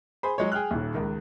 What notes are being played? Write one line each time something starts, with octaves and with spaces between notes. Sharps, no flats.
G#4 C5 B5
F#3 G#3 C#5
G#4 G5 F6 F#6
D#1 D#2
C#2 D#3